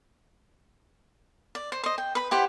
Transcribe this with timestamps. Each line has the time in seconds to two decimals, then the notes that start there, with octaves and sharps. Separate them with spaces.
1.55 D5
1.72 C5
1.84 C5 D#5
1.98 G5
2.15 B4 B5
2.31 E4 G4 C5 F#5